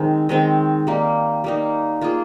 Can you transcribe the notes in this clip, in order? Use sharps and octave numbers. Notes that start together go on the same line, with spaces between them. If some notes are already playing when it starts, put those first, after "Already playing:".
Already playing: D#3 G#3 C4
D#3 G#3 C4
G3 A#3 D#4
G3 A#3 D#4
A#3 F4 G#4